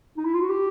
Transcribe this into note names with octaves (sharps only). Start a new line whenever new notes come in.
D#4
E4
F4
F#4
G4